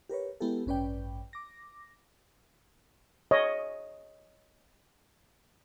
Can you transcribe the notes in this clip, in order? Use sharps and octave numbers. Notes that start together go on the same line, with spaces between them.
G4 A#4 B4 C#5
G#3 B3 E4 G4 A4
A1 G2 C#4 B4 D5 G5
D6 A#6
C#5 D#5